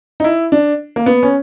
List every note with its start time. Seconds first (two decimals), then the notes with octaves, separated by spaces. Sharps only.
0.20 D#4
0.24 E4
0.52 D4
0.96 A#3
1.06 B3
1.23 C#4